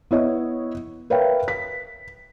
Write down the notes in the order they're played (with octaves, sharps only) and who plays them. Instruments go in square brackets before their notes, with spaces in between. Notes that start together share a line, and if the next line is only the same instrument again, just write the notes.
[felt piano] B3 E4 C#5 D#5
A#4 B4 C#5 E5 F5 G5
B6